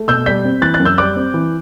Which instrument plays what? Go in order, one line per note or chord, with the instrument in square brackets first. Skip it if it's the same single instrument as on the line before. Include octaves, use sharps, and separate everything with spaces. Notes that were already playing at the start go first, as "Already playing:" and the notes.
Already playing: [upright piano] A3
B2 E6 G6
G3 G6 B6
C4
E3 F#6 A6
F#6 A6
F#2
E6 G6
G3 D6 F#6
C4
E3